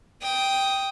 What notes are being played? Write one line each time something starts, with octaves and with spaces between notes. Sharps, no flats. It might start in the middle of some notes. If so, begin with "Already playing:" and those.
G5 D#6